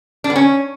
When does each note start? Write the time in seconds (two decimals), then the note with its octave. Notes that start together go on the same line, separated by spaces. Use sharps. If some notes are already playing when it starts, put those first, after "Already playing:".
0.24 D4
0.30 B3
0.36 C#4